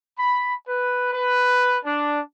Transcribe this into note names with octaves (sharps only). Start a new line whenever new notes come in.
B5
B4
B4
D4